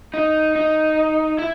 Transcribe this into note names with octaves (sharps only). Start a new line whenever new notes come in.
D#4
D#4
E4